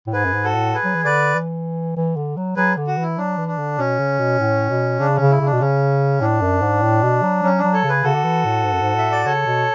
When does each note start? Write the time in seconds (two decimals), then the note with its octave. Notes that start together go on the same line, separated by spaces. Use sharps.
0.07 A2
0.13 G#2 G#4 B4
0.25 F#2
0.33 G#2
0.44 F#4 A4
0.54 A2
0.74 G#4 B4
0.84 F#3
0.95 E3
1.05 D3 B4 D5
1.35 E3
1.96 E3
2.16 D3
2.36 F#3
2.57 F#3 G#4 B4
2.77 D3
2.87 F#4
2.97 E3
3.02 E4
3.18 F#3 D4
3.38 E3
3.48 D4
3.58 D3
3.78 B2 C#4
3.99 C#3
4.19 B2
4.39 A2
4.69 B2
4.99 C#3 D4
5.15 C#3 C#4
5.30 E4
5.40 C#3
5.46 D4
5.53 B2
5.60 C#3 C#4
6.21 A2 D4
6.42 F#2
6.62 G#2
6.82 A2
7.03 B2
7.23 F#3
7.42 F#3 C#4
7.59 F#3 D4
7.73 A4 C#5
7.84 C#3
7.89 G#4 B4
8.03 C#3 F#4 A4
8.15 D3
8.24 E3
8.45 A2
8.65 G#2
8.73 F#2
8.81 G#2
8.95 A2 E5
9.12 D5
9.25 C#3 A4 C#5
9.46 B2